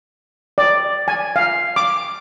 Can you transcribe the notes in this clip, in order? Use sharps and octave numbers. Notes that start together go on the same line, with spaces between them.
D5
G#5
F5
D6